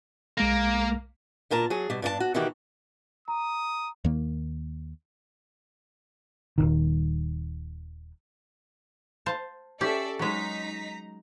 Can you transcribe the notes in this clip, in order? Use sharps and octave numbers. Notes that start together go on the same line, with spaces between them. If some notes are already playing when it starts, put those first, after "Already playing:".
B1 G#3 A#3 A#6
D2 A#2 A#4 A5
F#3 G#4
B2 G3
G2 D4 C#5 A5
F#4
B2 D#3 E3 E4 F#4 G4
A#5 D#6
D#2 D#3 A#3
D#1 G#1 D#3
C5 F5 A5
C#4 G4 A4 D5 E5
F#3 G#3 D#4 A#5 B6